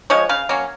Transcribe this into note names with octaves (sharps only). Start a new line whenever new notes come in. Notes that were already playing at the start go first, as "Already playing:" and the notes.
F3 G#3 C#5
C#3 F5
F#3 A#3 C#4